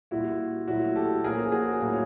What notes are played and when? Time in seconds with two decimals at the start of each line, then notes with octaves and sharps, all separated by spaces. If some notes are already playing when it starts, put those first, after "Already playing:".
0.11 A#2 G3 A#3 E4 F#4
0.67 A#2 F#3 A3 E4 F#4
0.96 G4 A4
1.24 A#2 F3 A#3 C#4 G#4 A#4
1.52 F#4 G#4
1.80 A2 F#3 A#3 C#4